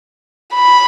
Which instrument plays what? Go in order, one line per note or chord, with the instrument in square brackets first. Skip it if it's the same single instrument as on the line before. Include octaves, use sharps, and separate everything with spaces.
[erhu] B5